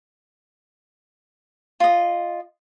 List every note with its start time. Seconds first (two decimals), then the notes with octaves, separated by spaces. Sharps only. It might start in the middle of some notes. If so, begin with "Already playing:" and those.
1.80 F4 D#5